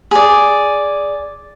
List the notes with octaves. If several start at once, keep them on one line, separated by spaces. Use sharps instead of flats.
G#4 D5